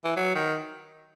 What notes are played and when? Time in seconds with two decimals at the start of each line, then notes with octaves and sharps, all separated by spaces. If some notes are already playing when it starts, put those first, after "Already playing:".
0.04 E3
0.16 F#3
0.35 D#3